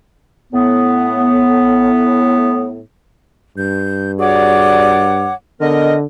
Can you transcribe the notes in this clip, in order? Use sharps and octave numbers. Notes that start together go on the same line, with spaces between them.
A2 B3
G2 G6
F#4 G#4 C#5 D5 F#5 D6
D3 B3 A#4 D#5